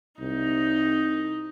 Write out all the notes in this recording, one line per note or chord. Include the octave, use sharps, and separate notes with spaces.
C2 D#4